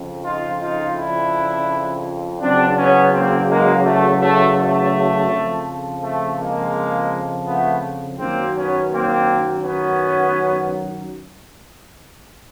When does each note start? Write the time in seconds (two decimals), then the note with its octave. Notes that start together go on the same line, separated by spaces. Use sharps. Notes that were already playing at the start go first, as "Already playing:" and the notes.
Already playing: F2 C#3 F3
0.24 D#4 F4
0.60 D#4 F4
0.96 D4 E4
2.40 E2 C#3 F#3 C4 D4
2.76 B3 C#4
3.13 A#3 C4
3.49 G#3 A#3
3.85 A3
4.21 A3
4.58 A3
5.30 F2 C#3 F3
6.03 A3
6.38 G#3 A#3
7.46 A3 B3
8.19 F#2 D#3 F#3 A#3 C4
8.55 B3 C#4
8.91 A#3 C4
9.63 B3 C#4